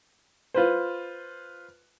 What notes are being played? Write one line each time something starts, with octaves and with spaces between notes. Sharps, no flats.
F4 B4 C5